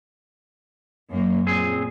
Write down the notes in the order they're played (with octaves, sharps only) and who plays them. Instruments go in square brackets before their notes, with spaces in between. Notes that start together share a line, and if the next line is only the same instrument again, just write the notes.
[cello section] F#2 A#3
[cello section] A#2 [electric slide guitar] C4 G#4